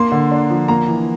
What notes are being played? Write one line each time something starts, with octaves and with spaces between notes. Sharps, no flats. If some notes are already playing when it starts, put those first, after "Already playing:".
Already playing: A#3 C6
D3
D4
F3
A#3 A#5
E3